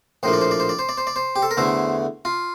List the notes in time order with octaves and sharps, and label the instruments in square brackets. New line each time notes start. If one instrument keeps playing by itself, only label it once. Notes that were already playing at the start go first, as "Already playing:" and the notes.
[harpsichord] A#1 A2 F3 A#3 C5
D5
C5
D5
C5
D5
C5
D5
C5
D5
C5
G4
A4
A#4
E2 D3 A3 E4 C5
F4